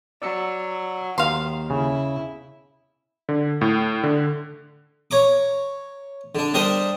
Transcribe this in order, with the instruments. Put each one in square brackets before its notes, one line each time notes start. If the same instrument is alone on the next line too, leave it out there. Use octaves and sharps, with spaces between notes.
[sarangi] F#3 [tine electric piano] D5 E6 C#7
[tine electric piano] D#2 [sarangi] D#3 [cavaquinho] F5 C6
[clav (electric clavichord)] C#3 [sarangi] E4
[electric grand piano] D3
A2
D3
[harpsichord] C#5 A#5 D6
D3 D4
G3 D4 A#4 C5 D#5